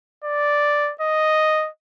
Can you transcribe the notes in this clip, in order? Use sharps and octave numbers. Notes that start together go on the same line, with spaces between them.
D5
D#5